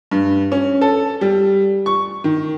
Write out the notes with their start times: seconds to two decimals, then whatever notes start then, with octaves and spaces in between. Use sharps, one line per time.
0.11 G2
0.52 C#4
0.81 A4
1.21 G3
1.86 C#6
2.24 D#3